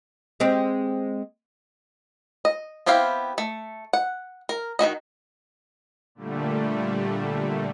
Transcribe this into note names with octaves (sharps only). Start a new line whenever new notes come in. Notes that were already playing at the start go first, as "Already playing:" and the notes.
G#3 C4 G4
D#5
B3 C4 E4 G4 F5
A3
F#5
A#4
D#3 E4 F#4 D#5
A#2 D3 G3 A3